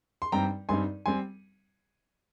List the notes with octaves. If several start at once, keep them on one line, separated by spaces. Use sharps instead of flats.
C6
G2 G3 C4 D#4 G5 A#5
G2 G3 C4 D#4 G#5 C6
G3 C4 G#5 C6